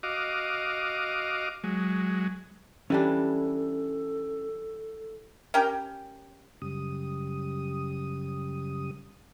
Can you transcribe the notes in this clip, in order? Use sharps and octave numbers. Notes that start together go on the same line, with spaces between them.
F#4 D#5 F5 D6
F#3 G#3
E3 G3 C#4 D4 A4
C#4 G4 A#4 G5
F#2 C#3 G3 D#6